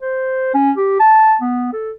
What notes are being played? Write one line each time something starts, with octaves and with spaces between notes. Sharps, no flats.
C5
C#4
G4
A5
B3
A4